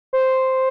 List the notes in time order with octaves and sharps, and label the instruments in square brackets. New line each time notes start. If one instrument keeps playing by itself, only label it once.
[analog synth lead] C5